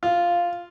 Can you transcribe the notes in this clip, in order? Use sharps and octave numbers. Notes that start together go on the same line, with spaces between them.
F4